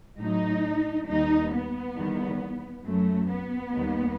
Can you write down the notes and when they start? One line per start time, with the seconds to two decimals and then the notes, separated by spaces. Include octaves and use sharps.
0.20 A2 F#3 D#4
1.09 D#2 D#3 G3 D#4
1.53 B3
1.97 E2 D#3 G3
2.85 F#2 F#3 A3
3.30 B3
3.73 D#2 D#3 G3